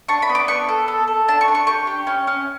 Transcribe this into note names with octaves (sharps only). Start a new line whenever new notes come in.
D4 C#6
B5
B3
D6
B3 C#6
A4
A4
A4
D4 A5
C#6
D4
C#6
G4 C#6
G4
C#4
C#4